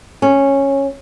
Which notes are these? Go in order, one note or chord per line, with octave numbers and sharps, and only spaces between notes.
C#4